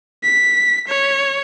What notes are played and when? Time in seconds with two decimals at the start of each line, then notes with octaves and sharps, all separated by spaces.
0.24 B6
0.88 C#5